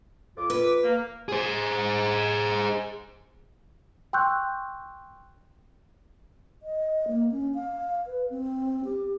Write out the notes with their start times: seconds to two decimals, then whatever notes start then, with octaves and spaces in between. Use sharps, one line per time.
0.37 F2 F4 D6
0.50 B4
0.83 A#3
1.29 G#4 C5
4.13 G5 C6 C#6 E6 F#6 G6
6.63 D#5
7.08 A#3
7.32 C#4
7.55 F5
8.06 B4
8.30 C4
8.85 G4